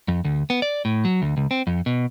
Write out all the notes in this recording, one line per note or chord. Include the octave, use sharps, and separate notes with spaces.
F2
D2
B3
D5
A2
F#3
D2
C#2
C4
F2
B2